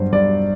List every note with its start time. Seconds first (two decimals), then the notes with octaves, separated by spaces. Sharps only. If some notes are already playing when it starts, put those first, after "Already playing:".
Already playing: G2 F#3 C5
0.12 G2 D5